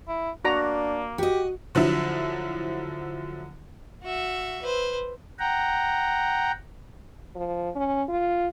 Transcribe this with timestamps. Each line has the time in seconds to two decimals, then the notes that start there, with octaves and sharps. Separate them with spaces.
0.08 E4
0.45 A#3 D4 F#4 A#5
1.18 F#4 G4 D#5
1.75 D3 F3 F#3 E4
4.03 F#4 E5
4.62 B4 C5
5.39 F#5 G5 A#5
7.35 F3
7.75 C#4
8.08 F4